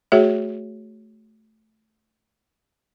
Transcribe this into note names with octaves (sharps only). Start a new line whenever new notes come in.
A3 F#4 G#4 C#5 E5